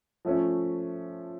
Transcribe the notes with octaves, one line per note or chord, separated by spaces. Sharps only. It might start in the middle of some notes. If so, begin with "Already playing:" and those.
F3 A3 C#4